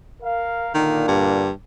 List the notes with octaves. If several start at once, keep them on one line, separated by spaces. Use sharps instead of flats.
A#4 F5
A#2 D3 D#3 A#3
G2